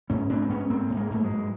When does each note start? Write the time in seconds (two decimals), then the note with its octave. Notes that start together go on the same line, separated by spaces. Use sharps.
0.10 G#2 B3 C#4
0.29 G#2 C4 D4
0.49 G#2 B3 C#4
0.70 G#2 A#3 C4
0.90 G#2
0.97 G#3 A#3
1.10 G#2 A3
1.23 F#3 G#3
1.30 G#2